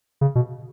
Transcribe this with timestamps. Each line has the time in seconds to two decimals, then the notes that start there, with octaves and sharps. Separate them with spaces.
0.21 C#3
0.35 B2